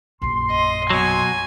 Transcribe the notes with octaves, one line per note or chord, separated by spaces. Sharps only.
A#1 F#2 C6
D#5
B2 F#3 G#5